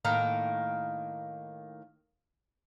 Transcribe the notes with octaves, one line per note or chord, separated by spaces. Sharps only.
A2 D#3 A#3 A#5